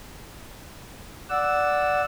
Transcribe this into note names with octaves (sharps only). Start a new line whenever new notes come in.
D5 F#5 E6